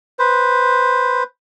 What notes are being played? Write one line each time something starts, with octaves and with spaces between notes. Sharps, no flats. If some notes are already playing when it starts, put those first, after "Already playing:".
B4 C5